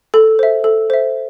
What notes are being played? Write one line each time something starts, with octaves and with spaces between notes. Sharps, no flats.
A4
C5 E5
A4
C5 E5